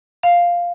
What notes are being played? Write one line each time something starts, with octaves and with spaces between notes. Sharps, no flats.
F5